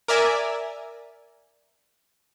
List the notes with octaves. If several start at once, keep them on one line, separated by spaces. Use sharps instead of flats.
A#4 D5 E5 G#5